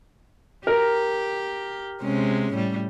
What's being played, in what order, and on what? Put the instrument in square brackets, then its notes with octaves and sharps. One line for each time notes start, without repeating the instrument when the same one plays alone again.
[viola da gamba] G4 [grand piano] A#4
[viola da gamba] C3 G#3 C#4
A2 G3